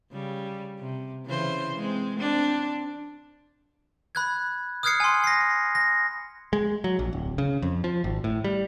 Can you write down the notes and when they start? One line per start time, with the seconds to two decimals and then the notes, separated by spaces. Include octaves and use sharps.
0.12 C#3 G3
0.80 C3
1.26 C#3 E3 C5
1.76 G#3 C4
2.16 C4 D4
4.15 B5 F#6 G#6
4.83 D#6 F6 F#6 G#6 C7 C#7
5.00 G#5 C6
5.24 A#6 C7
5.75 A#6
6.53 G#3
6.84 F#3
6.99 A#1
7.13 D1
7.38 C#3
7.62 F2
7.84 F3
8.04 G#1
8.24 A2
8.44 G3